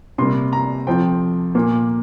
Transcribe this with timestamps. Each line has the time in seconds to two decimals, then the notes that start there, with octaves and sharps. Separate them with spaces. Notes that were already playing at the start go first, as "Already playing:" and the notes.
0.18 C3 G3 A#3 C6
0.53 A#5
0.87 F2 F3 C4 G5
1.55 A#2 A#3